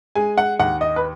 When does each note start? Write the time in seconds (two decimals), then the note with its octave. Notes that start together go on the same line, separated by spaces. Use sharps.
0.15 G#3 G#5
0.38 F#5
0.59 D#2 F#5
0.81 D#5
0.96 B4